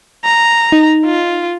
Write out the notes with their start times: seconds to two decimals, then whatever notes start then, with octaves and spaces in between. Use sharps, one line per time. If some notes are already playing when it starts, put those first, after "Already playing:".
0.25 A#5
0.72 D#4
1.05 F4